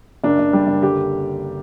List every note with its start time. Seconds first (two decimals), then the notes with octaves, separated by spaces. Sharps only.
0.24 F#1 D4
0.39 F#1
0.53 G3
0.67 F#1
0.82 D3 G4